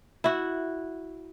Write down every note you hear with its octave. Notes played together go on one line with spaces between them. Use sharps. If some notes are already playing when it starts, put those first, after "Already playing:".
E4 F#4